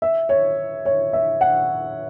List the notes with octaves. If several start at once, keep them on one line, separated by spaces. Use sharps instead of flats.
E5
C#5
C#5
E5
F#5